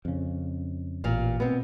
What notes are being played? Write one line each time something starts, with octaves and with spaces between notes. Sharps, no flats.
F2 C#3
A1 A#2 F5
B2 B3 C4